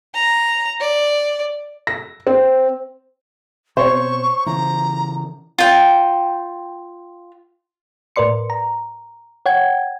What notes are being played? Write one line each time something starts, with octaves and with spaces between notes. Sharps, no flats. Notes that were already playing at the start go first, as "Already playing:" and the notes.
A#5
D5
A#6
C4
B2 C4 C5 C#5 C#6
C#3 E3 A#5
F4 G5
A2 A#4 B4 D5 C6 C#7
A#5
C#5 F#5 G5 G#6